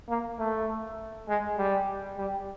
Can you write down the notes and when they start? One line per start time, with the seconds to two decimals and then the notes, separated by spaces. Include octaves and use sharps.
0.09 A#3
0.39 A3
1.28 G#3
1.58 G3
2.17 G3